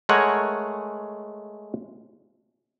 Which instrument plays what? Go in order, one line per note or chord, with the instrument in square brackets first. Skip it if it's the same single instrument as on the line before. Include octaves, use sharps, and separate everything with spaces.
[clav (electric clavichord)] G#3 A3 A#4 C#5 F#5 G#5